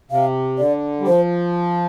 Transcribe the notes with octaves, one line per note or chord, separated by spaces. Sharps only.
C3 F5
D3 D5
G3
F3 C5